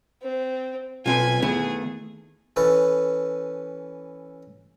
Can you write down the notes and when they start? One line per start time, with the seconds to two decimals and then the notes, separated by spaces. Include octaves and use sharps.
0.23 C4
1.06 B1 C4 F4 B4 G5 G#5
1.42 D#3 A3 B3 E4 G#4
2.56 E3 C#4 A4 B4